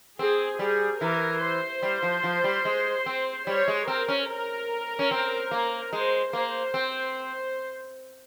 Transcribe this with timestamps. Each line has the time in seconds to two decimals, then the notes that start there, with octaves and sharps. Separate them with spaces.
0.19 C4 G#4
0.59 G3 G#4
1.01 E3 A#4
1.41 C5
1.82 G3
2.03 F3
2.24 F3
2.44 G3
2.65 G#3
3.06 C4
3.47 G3 C#5
3.68 G#3
3.88 C4 A#4
4.08 C#4
4.28 A#4
4.99 C#4
5.11 C4
5.51 A#3
5.93 G#3 C5
6.33 A#3 C5
6.74 C4